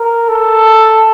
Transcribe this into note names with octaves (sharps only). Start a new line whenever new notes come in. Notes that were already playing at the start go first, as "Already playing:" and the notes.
Already playing: A#4
A4